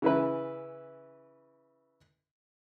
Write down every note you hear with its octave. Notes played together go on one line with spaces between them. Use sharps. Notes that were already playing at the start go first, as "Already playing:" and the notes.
C#3 E3 E4 B4